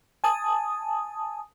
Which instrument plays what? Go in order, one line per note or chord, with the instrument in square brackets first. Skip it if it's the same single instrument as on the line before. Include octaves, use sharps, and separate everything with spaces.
[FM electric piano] G#5 A5 D#6